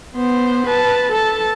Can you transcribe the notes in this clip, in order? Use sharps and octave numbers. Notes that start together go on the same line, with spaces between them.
B3 C5
B4 A5
A4 A5